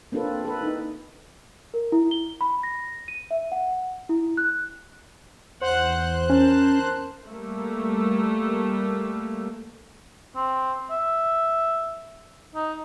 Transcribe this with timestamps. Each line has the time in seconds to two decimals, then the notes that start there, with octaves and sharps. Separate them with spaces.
0.12 A#3 C4 D4 F4 A4 B4
0.45 A4 B4
0.61 D#4 E4
1.74 A#4
1.92 E4
2.11 G7
2.41 B5
2.63 A#6
3.08 D#7
3.31 E5
3.52 F#5
4.09 E4
4.37 F#6
5.61 E2 C5 F#5 F#6
6.30 C#4 A#4 A5
7.27 G3 A3 A#3
10.36 C4
10.91 E5
12.54 D#4